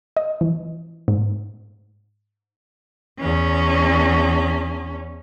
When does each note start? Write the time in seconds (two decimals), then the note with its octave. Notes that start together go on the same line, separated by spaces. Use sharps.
0.17 D#5
0.41 E3
1.08 G#2
3.20 E2 C#4